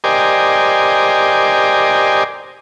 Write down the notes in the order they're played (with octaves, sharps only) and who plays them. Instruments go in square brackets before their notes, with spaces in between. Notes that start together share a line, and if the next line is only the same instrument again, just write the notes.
[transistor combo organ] G4 A#4 C5 D5 D#5 G#5